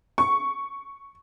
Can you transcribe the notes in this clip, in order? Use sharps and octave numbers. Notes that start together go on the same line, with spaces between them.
C#6